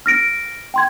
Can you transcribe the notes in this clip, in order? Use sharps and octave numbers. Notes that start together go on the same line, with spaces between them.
F6 A#6 D7
G5 C6 G#6